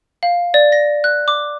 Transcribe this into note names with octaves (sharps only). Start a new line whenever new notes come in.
F5
D5
A#6
F#6
D6